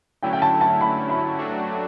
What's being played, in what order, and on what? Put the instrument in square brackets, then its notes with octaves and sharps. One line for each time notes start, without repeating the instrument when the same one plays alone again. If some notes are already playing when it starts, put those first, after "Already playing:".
[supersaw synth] D3 F#3 A3 C#4 E4 [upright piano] G5
[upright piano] G5
A5
A5
B5
B5
[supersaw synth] F#3 A3 D4 F#4